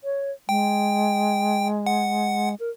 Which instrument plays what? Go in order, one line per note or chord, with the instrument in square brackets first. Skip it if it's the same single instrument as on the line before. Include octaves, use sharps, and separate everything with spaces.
[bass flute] C#5
[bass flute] G#3 [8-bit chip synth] G5
[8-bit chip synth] F#5
[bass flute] A#4